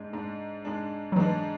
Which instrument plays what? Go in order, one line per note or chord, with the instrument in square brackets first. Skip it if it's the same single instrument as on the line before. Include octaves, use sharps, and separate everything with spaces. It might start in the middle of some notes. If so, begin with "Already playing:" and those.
Already playing: [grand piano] G#2 G#3 D4
G#2 G#3 D4
G#2 G#3 D4
[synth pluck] F#3
[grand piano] G#2 G#3 D4 [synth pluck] E3